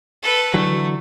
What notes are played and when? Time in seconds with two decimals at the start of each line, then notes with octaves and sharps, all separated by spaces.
0.22 A4 B4
0.54 D3 E3 F#3 A3